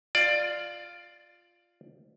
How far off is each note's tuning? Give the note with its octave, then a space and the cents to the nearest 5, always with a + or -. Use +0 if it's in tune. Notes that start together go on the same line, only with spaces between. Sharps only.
F4 +0 D5 +15